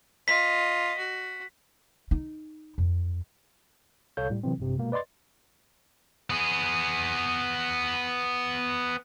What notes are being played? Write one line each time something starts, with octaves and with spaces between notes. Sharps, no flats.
F4 D#5 B6
F#4
D#4
F2
C2 C3 A4 C#5 F5 G6
A2 G3
C3 E3 F#3 C4
A1 G2 C3
B2 G#3 A#3
B4 D5 D#5 C6 A6
B3 G#4